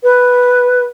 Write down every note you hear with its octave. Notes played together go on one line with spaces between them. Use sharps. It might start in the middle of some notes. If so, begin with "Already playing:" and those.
B4